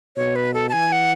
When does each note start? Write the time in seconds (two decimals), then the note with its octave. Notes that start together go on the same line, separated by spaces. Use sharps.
0.16 B2 C#5
0.36 B4
0.54 A4
0.69 A5
0.73 E3 G#5
0.92 F#5